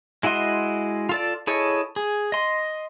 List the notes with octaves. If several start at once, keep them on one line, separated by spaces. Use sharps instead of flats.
G#3 E4 F#4 D#5 C6
F4 A4 D5
E4 G#4 A4 C#5 D#5
G#4
D#5 C6